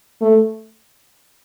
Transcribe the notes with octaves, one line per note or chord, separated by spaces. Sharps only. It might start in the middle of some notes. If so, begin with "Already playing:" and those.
A3